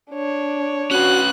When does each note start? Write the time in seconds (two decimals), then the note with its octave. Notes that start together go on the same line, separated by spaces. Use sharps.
0.12 D4 C#5
0.91 C#4 F#4 B4 F#6